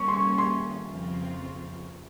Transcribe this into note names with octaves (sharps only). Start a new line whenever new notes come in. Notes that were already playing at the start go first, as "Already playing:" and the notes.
Already playing: D#3 G3 A#3 C#4 C#6
C6
C#6
C6
F2 C#3 F3 C4 F4